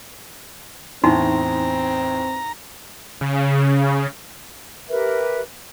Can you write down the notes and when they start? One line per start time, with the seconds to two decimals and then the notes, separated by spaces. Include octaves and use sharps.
1.04 E2 A2 C4 D4 D#4 A#5 C6
3.21 C#3
4.89 G4 A#4 B4 E5